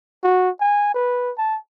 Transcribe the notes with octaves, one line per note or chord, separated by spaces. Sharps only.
F#4
G#5
B4
A5